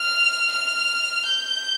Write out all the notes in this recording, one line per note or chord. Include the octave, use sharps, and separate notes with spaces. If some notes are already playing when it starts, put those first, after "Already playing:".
Already playing: F6
F6
G6